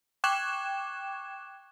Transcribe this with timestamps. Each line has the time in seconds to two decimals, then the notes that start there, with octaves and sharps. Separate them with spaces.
0.24 G5 C#6 D6 F#6 G#6 E7